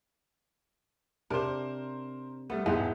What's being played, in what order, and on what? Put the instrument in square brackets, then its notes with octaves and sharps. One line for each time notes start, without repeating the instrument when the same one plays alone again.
[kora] C3 D4 [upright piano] A#4 C5
[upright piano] G3 A3 [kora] B3
[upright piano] E1 G#2 [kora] E3 G#3 B3